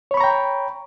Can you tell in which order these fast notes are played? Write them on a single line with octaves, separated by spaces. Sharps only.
C#5 B5 C#6 A#5 G5